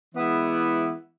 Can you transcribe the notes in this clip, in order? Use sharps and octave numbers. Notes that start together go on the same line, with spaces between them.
E3 G#3 B3 E4